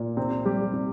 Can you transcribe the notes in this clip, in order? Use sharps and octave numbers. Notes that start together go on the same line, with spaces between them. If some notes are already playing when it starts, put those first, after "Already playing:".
Already playing: A#2
C3 C4
G3 G4
C3